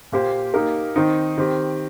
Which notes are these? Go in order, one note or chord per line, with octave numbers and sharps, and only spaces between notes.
A#2 A#3 G4 C5
A#3 D#4 G4 A#4
D#3 C4 D#4
D#3 C4 G4